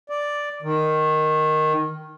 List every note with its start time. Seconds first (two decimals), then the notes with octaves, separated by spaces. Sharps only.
0.10 D5
0.62 D#3